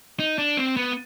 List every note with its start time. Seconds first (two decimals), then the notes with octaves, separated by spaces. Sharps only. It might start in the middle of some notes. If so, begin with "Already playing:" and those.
0.19 D#4
0.38 D4
0.57 C4
0.77 B3